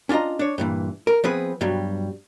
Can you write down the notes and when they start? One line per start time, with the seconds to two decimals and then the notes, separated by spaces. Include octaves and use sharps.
0.09 C#4 D4 F4 D#5 A#5
0.39 D4 C#5
0.58 G2 A#2 E3
1.07 A#4
1.24 F3 B3 C4 G#4 B4
1.61 G2 B2 F#3 G3